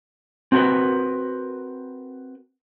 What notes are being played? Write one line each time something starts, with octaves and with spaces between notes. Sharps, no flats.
C4 F#4 G#4 A#4 B4